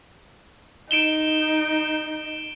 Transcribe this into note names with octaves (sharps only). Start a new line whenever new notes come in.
D#4 D7 E7 G7